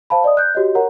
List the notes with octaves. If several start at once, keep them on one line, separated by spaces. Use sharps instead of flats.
C5 F5 A5 B5
D5 D#5 D#6
F#6 G6
F#4 G4 C#5 D#5
A#4 C#5 F#5 A#5